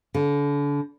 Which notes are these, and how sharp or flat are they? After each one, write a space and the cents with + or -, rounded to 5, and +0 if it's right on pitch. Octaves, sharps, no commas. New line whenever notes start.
D3 -35